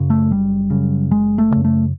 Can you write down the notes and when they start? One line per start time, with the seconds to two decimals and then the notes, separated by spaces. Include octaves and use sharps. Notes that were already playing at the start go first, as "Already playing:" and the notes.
Already playing: F#2 C#3
0.10 A3
0.31 F#1 G3
0.70 F#2 C#3
1.11 F#1 G#3
1.38 A3
1.51 C#3
1.56 F#2
1.65 A3